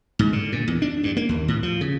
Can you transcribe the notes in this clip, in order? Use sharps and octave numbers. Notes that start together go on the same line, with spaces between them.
G#2
D3
A#2
E2
D4
G2
A#3
D#2
A2
F3
C#3